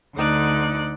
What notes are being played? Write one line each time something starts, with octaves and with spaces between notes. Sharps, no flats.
D2 D3 D#4 D5 F#6